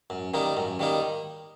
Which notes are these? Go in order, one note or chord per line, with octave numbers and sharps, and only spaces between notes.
F#2
D#3 G3 A#3 D#4
F#2
D#3 G3 A#3 D#4